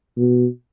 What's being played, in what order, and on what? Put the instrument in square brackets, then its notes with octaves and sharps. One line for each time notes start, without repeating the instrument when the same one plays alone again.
[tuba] B2